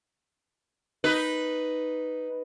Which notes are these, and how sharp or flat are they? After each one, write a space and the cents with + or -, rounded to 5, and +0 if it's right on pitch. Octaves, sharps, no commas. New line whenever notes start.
D#4 +0 B4 +0